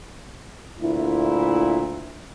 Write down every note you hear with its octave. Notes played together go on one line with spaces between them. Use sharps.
D2 A#2 E4